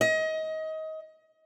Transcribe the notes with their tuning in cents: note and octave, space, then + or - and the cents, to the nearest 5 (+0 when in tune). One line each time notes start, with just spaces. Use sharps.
D#5 +25